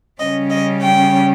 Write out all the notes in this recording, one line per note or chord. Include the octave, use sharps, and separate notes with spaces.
C#3 G3 C#4 D#5
D#5
G5